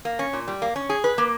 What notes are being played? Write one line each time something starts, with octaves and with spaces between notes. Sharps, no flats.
A#3
C#4
A#2
G3
A#3
C#4
G#4
B4
A#3